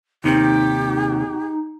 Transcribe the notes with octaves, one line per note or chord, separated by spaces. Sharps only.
D#2 C3 D#3 D#4 G4